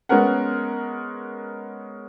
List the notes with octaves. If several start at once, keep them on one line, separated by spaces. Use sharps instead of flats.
G#3 B3 C#4 A#4 F#5